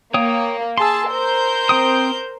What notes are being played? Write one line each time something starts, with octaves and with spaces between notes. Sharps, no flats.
A#3 C#5 G5 D#6
G#4 A5 C6 E6
A#4 C5 G6
C4 G5 D#6